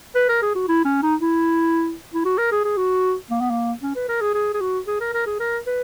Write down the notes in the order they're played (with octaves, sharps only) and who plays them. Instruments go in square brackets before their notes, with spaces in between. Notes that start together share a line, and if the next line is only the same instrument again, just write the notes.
[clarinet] B4
A#4
G#4
F#4
E4
C#4
D#4
E4
E4
F#4
A#4
G#4
G#4
F#4
A#3
B3
A#3
C#4
B4
A#4
G#4
G#4
G#4
F#4
G#4
A#4
A#4
G#4
A#4
B4